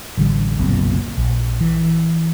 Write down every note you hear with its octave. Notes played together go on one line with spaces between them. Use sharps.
A1 D3 G3
F#1 B1 A#2 C4
A#1
E3